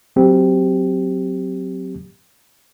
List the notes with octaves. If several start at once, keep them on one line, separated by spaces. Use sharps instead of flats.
F#3 C4 G4